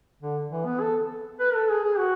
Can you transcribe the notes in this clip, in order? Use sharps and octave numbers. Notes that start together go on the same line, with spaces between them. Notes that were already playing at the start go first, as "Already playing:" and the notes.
D3
E3
B3
A4
B4
A4
G#4
G#4
F#4